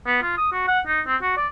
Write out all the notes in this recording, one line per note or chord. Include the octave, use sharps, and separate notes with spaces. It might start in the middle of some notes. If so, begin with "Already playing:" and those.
B3
F4
D#6
F#4
F#5
D#4
C4
F#4
D5